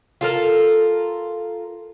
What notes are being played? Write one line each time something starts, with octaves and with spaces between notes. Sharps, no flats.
F4 A4 A#4